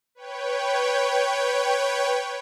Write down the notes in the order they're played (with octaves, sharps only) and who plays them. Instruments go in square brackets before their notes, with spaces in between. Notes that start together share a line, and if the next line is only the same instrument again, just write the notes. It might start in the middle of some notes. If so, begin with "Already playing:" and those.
[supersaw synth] B4 C#5 G5